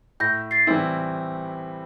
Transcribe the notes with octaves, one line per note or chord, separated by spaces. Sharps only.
A2 G6 A#6
A6 C7
E3 G3 C4 E4